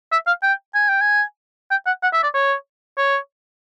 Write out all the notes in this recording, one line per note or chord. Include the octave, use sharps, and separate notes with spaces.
E5
F5
G5
G#5
G5
G#5
G5
F#5
F#5
E5
D5
C#5
C#5